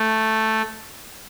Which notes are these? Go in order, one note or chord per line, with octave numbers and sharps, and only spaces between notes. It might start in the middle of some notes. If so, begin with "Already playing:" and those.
Already playing: A3